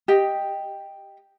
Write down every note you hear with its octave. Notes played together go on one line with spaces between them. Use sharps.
G4 D#5 G5